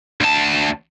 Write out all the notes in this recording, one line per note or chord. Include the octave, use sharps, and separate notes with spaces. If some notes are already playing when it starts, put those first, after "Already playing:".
D2 A5